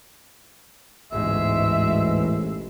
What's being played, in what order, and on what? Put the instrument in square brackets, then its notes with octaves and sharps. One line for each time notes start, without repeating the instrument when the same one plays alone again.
[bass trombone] A1 [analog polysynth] D2 G#2 B2 [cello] G#3 [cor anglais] E5